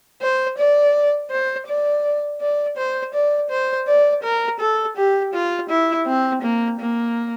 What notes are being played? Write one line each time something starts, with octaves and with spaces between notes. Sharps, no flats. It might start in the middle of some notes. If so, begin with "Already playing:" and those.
C5
D5
C5
D5
D5
C5
D5
C5
D5
A#4
A4
G4
F4
E4
C4
A#3
A#3